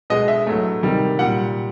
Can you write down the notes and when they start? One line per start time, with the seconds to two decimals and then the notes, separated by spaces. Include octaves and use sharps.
0.10 B2 G#3 D#5
0.28 E5
0.47 A2 F#3 A3
0.83 C3 D#3 G3
1.19 A#2 G3 F#5